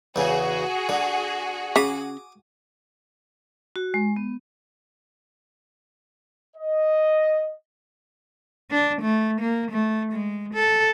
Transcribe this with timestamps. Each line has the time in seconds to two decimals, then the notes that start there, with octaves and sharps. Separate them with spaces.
0.16 E2 C#3 F#4 G#4
0.89 D3
1.76 C#3 D6 D#6
3.76 F#4
3.94 G#3
4.16 B3
6.56 D#5
8.71 D4
9.02 A3
9.41 A#3
9.72 A3
10.13 G#3
10.54 A4